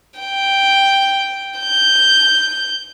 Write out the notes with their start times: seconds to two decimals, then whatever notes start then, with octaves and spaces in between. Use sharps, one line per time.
0.20 G5
1.60 G6